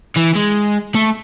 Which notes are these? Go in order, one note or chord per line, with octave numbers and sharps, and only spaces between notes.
E3
G#3
A3